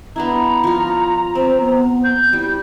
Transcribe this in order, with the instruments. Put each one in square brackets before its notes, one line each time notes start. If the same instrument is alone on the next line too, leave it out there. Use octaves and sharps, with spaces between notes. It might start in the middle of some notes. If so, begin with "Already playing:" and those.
[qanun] B3 D4 E4 [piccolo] A#5
[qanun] F3 F4
[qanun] C4 [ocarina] C5
[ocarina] B3
[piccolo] G6
[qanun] G3 [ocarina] E4